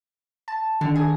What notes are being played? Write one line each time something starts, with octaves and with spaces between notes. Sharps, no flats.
A5
D3 D#3
G#4